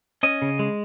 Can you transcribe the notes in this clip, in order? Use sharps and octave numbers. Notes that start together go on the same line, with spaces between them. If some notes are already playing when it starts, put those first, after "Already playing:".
C#4 D#5
C#3
G#3